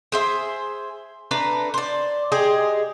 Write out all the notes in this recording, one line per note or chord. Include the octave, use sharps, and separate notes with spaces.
G#4 C5 E5
A3 D4 B4 A#5
C5 D5
G#3 G4 G#4